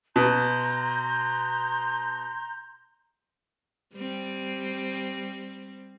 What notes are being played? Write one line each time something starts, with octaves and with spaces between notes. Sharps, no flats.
B2 A#5 C6 G6
G3 C4